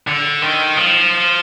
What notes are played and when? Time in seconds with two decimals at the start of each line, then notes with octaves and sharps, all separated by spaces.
0.07 D3
0.42 D#3
0.77 F3